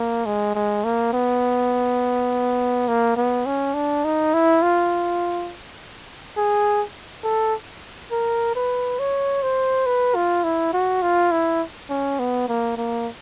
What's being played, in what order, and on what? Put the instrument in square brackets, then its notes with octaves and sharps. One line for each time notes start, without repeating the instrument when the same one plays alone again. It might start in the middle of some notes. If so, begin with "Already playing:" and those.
Already playing: [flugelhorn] A#3
G#3
G#3
A#3
B3
A#3
B3
C#4
D4
D#4
E4
F4
G#4
A4
A#4
B4
C#5
C5
B4
F4
E4
F#4
F4
E4
C#4
B3
A#3
A#3